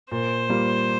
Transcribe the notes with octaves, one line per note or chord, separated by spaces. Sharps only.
A#2 C5
G3 A#3 F4